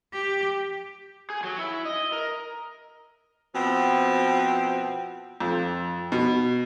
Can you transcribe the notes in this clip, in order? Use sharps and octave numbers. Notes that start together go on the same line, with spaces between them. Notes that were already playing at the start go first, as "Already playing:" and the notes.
G4
G#4
F#3
E4
D#5
A#4
B2 F3 C4
F2
B2